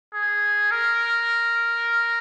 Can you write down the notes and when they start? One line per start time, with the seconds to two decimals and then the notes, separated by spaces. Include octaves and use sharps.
0.14 G#4
0.71 A#4